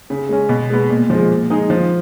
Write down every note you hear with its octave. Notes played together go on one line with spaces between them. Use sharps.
C#3
G#3 C#4
B2
G#3 B3
A#2
F3 G#3
A#2
G#3 D#4 G#4
F3